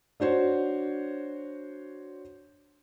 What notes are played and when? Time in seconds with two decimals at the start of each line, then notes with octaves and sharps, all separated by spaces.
0.20 D4 F#4 C5 C#5